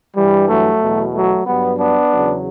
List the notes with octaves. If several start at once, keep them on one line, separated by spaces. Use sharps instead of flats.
G2 E3 G3
F#3 A3
E2 B2 F#3
F#3 A3
G2 F#3 G3 B3
B3 D4
E2 C#3 F#3